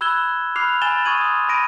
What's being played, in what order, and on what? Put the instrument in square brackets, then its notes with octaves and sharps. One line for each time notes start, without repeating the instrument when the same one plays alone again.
[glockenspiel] B5 E6 F#6 G#6 E7 G7
B5 D6 F6 F#6 C7 F7
G#5 B5 A6 E7 G7
C#6 D#6 G#6 D#7 F#7
C6 D#6
B5 G#6 A#6 D7 D#7